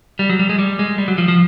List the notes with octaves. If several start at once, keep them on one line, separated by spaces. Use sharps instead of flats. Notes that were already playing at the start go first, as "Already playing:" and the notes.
G3
F#3
G3
G#3
G3
G#3
G3
F#3
F3
F3